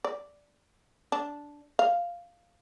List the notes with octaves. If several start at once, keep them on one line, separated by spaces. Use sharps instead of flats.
D5
D4
F5